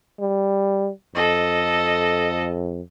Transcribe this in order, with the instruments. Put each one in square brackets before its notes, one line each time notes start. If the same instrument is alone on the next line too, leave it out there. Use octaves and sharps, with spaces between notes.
[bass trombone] G3
[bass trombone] F2 [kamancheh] A4 D#5